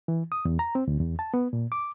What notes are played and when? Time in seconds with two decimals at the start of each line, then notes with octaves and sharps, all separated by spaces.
0.08 E3
0.32 D#6
0.45 E2
0.59 A#5
0.75 C4
0.88 D2
1.00 E2
1.19 A5
1.34 B3
1.53 A#2
1.72 D6